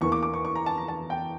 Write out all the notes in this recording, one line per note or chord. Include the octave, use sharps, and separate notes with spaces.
E2 E3 A#3 C#6
D6
D6
C#6
C#6
A#5
A5
A#5
A5
G5